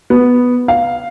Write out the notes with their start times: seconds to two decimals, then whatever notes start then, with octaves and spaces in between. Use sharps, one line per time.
0.10 B3
0.68 F5